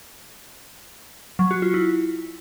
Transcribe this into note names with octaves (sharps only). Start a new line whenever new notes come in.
F#3
F#4
F4
E4